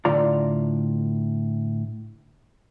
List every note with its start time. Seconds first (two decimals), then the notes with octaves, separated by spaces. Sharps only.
0.05 A2 D3 F4 D5 A#5